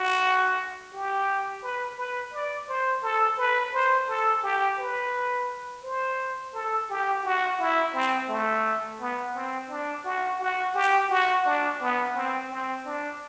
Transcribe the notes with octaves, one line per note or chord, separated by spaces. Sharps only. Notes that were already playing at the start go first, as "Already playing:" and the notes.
Already playing: F#4
G4
B4
B4
D5
C5
A4
B4
C5
A4
G4
B4
C5
A4
G4
F#4
E4
C4
A3
B3
C4
D4
F#4
F#4
G4
F#4
D4
B3
C4
C4
D4